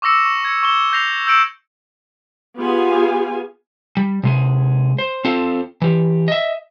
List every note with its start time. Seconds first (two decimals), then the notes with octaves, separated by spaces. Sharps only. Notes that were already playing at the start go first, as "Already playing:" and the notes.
0.02 C#6 D6 E6 A#6 C#7 E7
0.25 C#6
0.45 G#6 C#7
0.63 C#6 E7 G7
0.93 G6 A#6 C7 F7
1.27 E6 G6 C#7 D7 E7 F#7
2.57 B3 F4 G4 G#4 F5 G#5
3.97 G3
4.23 C3 G#3 G#4
4.98 C5
5.25 C4 F4 A4 C5 F5
5.82 E3 G4
6.28 D#5 E5